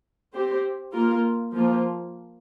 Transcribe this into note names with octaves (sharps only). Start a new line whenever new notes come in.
C4 G4 C5
A#3 F4 A#4
F3 A#3 F4